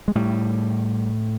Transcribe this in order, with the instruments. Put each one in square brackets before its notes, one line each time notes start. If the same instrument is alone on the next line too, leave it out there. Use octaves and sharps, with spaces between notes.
[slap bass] G#3
A2 G3